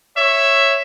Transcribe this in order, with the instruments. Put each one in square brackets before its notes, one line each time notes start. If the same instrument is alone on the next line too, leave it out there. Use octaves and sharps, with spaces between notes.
[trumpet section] C#5 E5